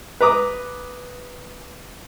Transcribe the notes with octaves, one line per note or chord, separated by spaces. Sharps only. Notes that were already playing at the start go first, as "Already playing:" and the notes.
B4 A#5 D6 D#6